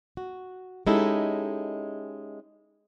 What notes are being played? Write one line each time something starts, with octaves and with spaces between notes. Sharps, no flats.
F#4
G#3 C#4 D#4 E4 G4 A4